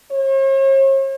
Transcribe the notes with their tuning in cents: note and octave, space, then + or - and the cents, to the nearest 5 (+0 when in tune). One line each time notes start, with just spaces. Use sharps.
C#5 -45